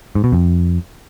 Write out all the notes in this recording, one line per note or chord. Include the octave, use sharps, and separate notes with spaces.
G#2
B2
F2